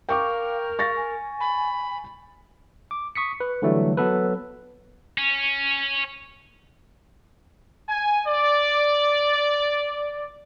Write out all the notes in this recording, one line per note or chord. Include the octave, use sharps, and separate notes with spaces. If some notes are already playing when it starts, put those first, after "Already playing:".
A#4 F5 G5 C#6 D6
F5 C#6 A6 A#6
G#5
B5
D6
C#6 D#6 B6 C#7
B4
D3 E3 F#3 G3 A3
F#3 B3 A4 B4
C#4
G#5
D5